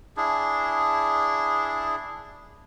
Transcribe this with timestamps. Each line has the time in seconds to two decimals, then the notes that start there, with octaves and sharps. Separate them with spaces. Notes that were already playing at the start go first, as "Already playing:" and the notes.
0.17 D4 E4 G#4